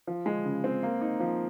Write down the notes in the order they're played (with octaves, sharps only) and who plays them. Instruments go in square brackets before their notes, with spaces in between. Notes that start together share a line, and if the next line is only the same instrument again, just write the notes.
[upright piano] F3
G#3
C#3
C4
A#3
D#4
F3